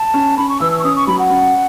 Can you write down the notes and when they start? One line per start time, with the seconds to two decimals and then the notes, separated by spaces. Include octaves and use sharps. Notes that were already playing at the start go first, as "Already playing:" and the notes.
Already playing: A5
0.14 C#4
0.37 C#4 B5
0.49 C#6
0.60 E3 E6
0.72 E6
0.80 C#6
0.84 C#4 D#6
0.96 C#6
1.07 F#3 B5
1.19 F#5
1.30 C#4